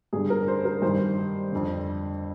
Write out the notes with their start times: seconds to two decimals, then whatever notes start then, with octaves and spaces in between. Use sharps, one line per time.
0.13 G2 D3 G#4
0.30 A#4
0.48 C5
0.65 A#4
0.82 G2 D#3 C5
1.52 F2 D3